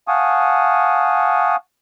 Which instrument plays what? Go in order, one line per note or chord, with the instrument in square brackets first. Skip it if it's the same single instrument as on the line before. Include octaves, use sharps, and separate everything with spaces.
[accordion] F5 F#5 G#5 A5 C#6 D#6